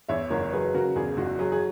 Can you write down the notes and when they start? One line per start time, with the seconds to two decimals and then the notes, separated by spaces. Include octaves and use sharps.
0.09 E2 C#5 E5
0.30 F#1 A#4 C#5
0.52 F#3 G#4 B4
0.74 C#3 F#4 A#4
0.96 E2 G#4
1.17 F#1 F#4
1.39 F#3 G#4
1.52 G#4